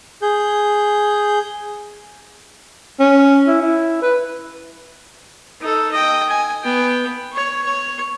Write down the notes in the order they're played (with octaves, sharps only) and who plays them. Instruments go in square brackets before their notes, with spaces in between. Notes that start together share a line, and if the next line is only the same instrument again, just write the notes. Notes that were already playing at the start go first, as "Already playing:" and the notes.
[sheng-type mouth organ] G#4 G6
[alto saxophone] C#4
E4
E4
B4
[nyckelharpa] D#4 A4
D#5 G5
G#5
B3 G5
C#5 C#6
C#5